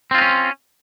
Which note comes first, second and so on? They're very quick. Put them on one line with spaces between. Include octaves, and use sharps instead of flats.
C4 F4 D#4 C#4